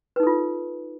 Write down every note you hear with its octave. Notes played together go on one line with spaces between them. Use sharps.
D#4 F4 A4 B4